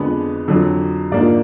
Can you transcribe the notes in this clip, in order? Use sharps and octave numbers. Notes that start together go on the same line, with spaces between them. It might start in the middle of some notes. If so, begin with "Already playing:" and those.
Already playing: F2 D3 G#3 B3 D4 B4
F2 D3 F#3
G#2 F3 A#3 D4 D5